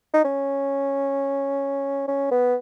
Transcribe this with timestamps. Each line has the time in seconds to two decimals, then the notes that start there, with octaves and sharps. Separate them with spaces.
0.14 D#4
0.24 C#4
2.08 C#4
2.31 B3